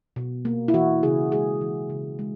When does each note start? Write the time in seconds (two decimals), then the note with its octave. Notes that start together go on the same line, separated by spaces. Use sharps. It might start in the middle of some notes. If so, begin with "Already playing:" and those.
0.16 B2
0.45 A#3
0.68 E4
0.74 E3 F#4
1.03 C#3 G#4
1.32 G#3 G#4
1.61 E3
1.90 C#3
2.19 G#3